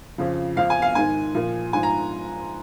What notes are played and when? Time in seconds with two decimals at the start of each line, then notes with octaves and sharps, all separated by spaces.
0.18 F2 C#3 F3
0.56 F2 F3 F5
0.70 G#5
0.82 F5
0.95 G#2 D#3 G#5
1.35 A#2 F3
1.73 G#2 F3 G#5
1.83 A#5